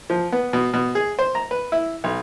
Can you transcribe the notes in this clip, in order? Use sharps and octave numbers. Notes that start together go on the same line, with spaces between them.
F3
B3
B2
B2
G#4
C5
A#5
B4
E4
B1